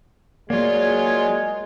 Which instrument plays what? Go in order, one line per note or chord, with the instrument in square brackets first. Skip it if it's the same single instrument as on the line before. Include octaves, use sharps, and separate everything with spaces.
[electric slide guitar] F#3 A#3 [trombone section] G#3 [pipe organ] F4 C#5 [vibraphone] D5